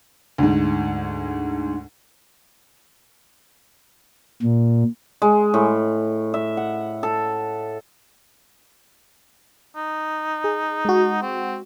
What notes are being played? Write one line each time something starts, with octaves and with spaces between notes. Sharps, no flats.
D2 G#2
A#2
G#3
A2
E5
F#5
A4
D#4
G#4
G#3 F#4
C4